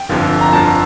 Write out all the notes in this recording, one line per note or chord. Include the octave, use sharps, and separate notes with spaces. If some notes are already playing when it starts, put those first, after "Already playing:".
Already playing: G5
G1 F2 D3 F3
A#5
G1 F2 D3 F3 A5